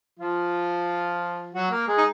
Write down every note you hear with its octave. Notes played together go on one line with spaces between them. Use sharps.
F3 F4
F#3 F#4
A#3 A#4
G#3 G#4
D#4